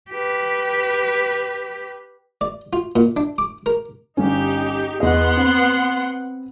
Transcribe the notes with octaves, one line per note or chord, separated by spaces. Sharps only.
G4 B4
D5
F4
A#2
D4
D6
A#4
G1 C#4 D#4 G4
E2 B3 D#5 F#5 C6
C4 B4